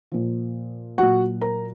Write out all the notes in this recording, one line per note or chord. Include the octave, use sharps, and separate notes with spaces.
A#2 F3
A#2 F#3 F#4 F#5
A#4 A#5